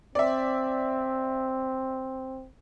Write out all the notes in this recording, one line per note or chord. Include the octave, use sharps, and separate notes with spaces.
C4 D5 E5